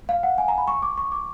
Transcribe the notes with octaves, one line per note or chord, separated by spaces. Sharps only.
F5
F#5
G#5
A#5
B5
C#6
D6
C#6
D6